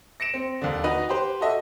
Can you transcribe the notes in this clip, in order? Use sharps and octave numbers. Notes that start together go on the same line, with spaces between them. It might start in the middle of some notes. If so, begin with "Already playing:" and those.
A#6 C#7 D7 E7
C4
D#2 D3
D#4 F#4 B4 D#5
G4 B4 C5
F#4 A4 D#5 E5